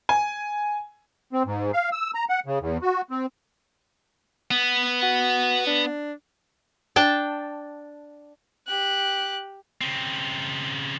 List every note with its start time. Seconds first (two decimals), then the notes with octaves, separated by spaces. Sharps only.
0.09 G#5
1.33 C4
1.46 G#2
1.73 F5
1.92 E6
2.15 A#5
2.29 F#5
2.46 C#3
2.60 E2
2.82 F#4
3.11 C4
4.51 B3
5.03 F#4
5.67 D4
6.96 D4 G5 A5
8.67 G4 F#6
9.81 C#3 C4